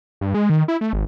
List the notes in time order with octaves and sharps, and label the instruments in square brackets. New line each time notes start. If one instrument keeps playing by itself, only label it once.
[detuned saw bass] G2
G#3
D#3
E4
A3
G#1